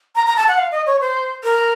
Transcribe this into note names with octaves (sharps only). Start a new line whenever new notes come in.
A#5
A#5
A5
F#5
F5
D#5
C#5
C5
A#4